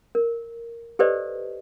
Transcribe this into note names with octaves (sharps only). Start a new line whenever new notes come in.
A#4
G4 A4 B4 C5 D5 D#5